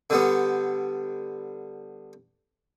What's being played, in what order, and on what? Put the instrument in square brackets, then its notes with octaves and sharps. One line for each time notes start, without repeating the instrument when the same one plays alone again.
[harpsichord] D3 G3 B3